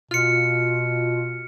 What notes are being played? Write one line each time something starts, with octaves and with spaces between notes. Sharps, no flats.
B2 F4 F6 C#7